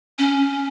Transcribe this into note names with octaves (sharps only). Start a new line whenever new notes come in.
C#4